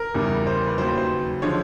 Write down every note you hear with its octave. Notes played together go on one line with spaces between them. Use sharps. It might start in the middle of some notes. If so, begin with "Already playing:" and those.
Already playing: A#4
E2 C#3 E3 G3
C5
B4
D#2 C#3 F#3 C5
B4
C5
D3 F3 G#3 C#5